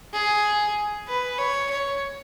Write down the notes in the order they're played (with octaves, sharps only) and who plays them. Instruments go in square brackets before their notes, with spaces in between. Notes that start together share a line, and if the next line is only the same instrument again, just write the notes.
[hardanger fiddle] G#4
B4
C#5
C#5